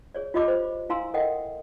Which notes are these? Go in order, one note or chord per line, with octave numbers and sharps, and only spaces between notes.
G#4 C#5 D5
F4 G4 D#5 B5 D6
C5
E4 F5 G#5 A#5 C6 E6
A4 A#4 D#5 E5 F#5 G5